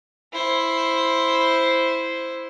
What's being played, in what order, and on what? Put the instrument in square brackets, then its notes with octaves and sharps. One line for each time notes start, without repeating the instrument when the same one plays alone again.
[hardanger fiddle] E4 C5